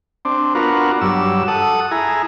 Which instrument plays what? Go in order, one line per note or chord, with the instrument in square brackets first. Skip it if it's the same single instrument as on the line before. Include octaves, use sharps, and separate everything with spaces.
[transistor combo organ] C4 D4
B3 D4 F4 F#4 A#4
G2 F#3 E6
A4 F#5 D#6
E4 G#4 A#5